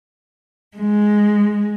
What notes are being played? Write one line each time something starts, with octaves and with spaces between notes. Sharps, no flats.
G#3